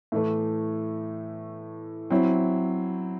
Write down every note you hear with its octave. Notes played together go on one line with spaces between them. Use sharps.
A2 E3 A3
F#3 C4 E4